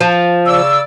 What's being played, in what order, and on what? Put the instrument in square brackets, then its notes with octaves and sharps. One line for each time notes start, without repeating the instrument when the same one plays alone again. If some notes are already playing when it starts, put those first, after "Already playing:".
[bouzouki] F3
[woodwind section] C#3 D5 E6